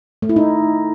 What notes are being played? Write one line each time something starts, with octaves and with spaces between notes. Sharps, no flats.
A3
E4
D#4